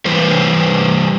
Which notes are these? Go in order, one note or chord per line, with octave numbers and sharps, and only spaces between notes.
E3 G3 B4 C5